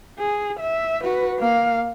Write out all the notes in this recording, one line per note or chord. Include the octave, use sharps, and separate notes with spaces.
G#4
E5
F#4 B4
A#3 F5